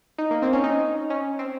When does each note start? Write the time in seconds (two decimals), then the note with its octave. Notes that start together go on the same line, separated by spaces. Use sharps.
0.18 D#4
0.31 A#3
0.42 C4
0.53 C#4
0.64 D#4
1.10 C#4
1.39 C4